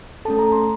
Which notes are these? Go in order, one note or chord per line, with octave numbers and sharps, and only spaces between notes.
A3 C#4 A4 A5
A#5
C6